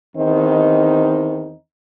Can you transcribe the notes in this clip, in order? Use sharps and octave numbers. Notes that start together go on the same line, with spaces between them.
E2 D#3 C4 D#4